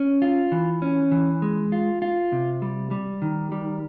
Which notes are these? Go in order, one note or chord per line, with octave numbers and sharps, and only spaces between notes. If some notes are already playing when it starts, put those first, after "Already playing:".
Already playing: C#4
F4
E3
C#4
E3
G#3
F4
F4
C3
G3
G3
D#3
G3